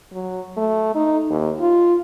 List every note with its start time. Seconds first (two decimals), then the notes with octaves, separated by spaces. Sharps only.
0.13 F#3
0.57 A3
0.95 D#4
1.29 D#2
1.60 F4